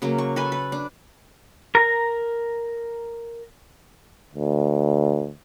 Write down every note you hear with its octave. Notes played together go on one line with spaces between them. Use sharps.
C#3 F#3 A#3
C#6
A4 B4 G#5
B4
D4
A#4 A#5
D2